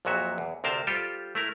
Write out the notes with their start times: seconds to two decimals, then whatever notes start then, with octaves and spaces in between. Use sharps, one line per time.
0.05 A#1 F2 A#2 F#3 F#4 E5
0.38 E2
0.64 D2 C3 A#4 C5 A5
0.87 G3 F4 G4 A4 C5
1.35 A3 E4 A#4